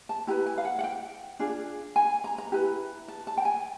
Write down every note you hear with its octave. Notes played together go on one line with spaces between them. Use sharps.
A5
E4 G4 B4 A#5
G#5
F5
F#5
F#5
G5
D4 F4 G#4
G#5
A#5
A#5
E4 G4 B4
A5
A5
G5
G#5